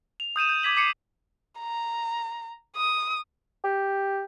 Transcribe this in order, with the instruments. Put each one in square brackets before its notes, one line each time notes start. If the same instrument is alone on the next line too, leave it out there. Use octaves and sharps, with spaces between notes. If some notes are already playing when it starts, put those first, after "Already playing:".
[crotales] F7
D#6 G6 D#7 E7
G6
D6 G#6 B6 F#7
D6 C7 C#7
[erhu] A#5
D#6
[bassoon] G4